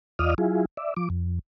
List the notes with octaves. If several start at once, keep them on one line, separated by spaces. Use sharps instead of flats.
E2 F4 D5 D#5 D#6 F6
F#3 E4 F4 G#4
D5 E5
F3 D6
F2